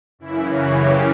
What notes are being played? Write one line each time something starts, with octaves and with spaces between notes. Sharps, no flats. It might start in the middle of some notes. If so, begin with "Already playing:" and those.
F#2 C#3 E3 E4
F#4
G4